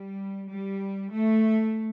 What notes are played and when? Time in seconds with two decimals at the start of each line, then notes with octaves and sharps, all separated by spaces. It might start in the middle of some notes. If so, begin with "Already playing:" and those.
Already playing: G3
0.49 G3
1.12 A3